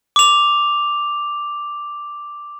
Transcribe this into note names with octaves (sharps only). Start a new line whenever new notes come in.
D6 F7